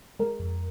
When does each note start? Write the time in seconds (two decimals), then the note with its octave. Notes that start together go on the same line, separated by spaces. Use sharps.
0.19 G#3 A#4
0.40 F2